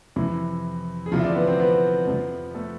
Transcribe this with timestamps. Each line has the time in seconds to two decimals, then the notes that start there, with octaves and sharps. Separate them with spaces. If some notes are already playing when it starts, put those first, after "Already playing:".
0.16 F2 C3 E3 E4
1.06 G#4
1.12 D2 C3 E3 F3 F4
1.19 E5
1.23 D4 D5
1.35 B3 B4
1.47 C4 C5
1.59 B3 B4
2.07 F2 C3 F3
2.54 A3 A4